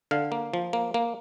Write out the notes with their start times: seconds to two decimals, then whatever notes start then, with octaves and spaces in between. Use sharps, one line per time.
0.11 D3 F5
0.32 A#3
0.54 F3
0.73 A#3
0.94 A#3